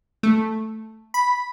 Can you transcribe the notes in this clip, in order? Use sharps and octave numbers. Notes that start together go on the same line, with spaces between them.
A3
B5